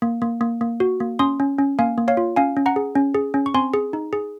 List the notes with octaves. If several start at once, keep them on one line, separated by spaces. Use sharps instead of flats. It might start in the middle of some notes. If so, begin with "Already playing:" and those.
A#3
A#3
A#3
A#3
F#4
A#3
C#4 C6 D#6
C#4
C#4
A#3 F5 G#5
A#3
C#5 F5
F4
C#4 F5 G#5
C#4
F#5 A#5
G#4
C#4
G#4
C#4
C#6
C4 G#5 C6
G#4
D#4
G#4